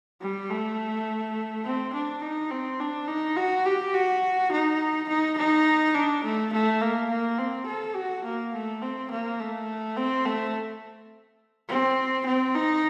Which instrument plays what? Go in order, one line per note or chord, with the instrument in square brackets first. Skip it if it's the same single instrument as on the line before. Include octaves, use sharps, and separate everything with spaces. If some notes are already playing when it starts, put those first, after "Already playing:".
[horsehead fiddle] G3
A3
C4
D4
D#4
C4
D4
D#4
F#4
G4
F#4
D#4
D#4
D#4
D4
A3
A3
A#3
A#3
C4
A4
F#4
A#3
A3
C4
A#3
A3
C4
A3
C4
C4
D#4